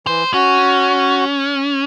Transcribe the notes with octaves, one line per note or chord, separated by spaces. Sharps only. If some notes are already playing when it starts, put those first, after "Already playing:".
E3 C5
C#4 F#4